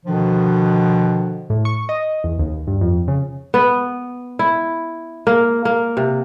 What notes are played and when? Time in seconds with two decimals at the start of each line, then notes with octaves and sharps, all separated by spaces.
0.06 B2 D3 D#3 F3 D4
1.50 A2
1.65 C#6
1.89 D#5
2.24 E2
2.39 D#2
2.67 G2
2.81 F2
3.08 C#3
3.54 B3
4.39 E4
5.27 A#3
5.65 A#3
5.97 C3